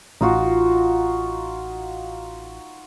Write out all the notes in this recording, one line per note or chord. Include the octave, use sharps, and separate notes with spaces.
A1 D#4 F4 F#4